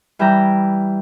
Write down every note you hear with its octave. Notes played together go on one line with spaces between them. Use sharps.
E3 G3 G4 E5 G5 A#5